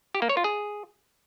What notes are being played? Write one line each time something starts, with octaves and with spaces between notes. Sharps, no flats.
G4
A#3
C#5
F4
G#4